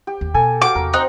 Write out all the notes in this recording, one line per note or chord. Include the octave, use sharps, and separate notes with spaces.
G4
D#2
B2 A4 G#5
F#4 F5 G5 D6
E2 C3 A#4
C4 D#4 A#5 F#6